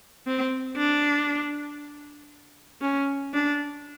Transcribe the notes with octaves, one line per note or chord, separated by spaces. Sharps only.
C4
D4
C#4
D4